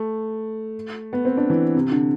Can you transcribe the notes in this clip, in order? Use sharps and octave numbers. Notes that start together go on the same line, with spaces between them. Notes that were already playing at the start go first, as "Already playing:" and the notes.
Already playing: A3
B3
C4
D4
E3
C3
D3